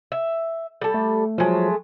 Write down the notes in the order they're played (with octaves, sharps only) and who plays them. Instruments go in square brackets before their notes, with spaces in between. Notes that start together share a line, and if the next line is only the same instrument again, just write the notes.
[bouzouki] E5
G3 A4
[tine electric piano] A3
[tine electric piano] F3 F#3 [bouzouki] G#3 A3